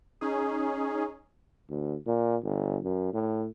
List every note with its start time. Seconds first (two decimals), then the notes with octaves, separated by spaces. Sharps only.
0.21 C#4 D#4 G#4
1.69 D2
2.07 A#2
2.42 G1
2.83 F#2
3.14 A2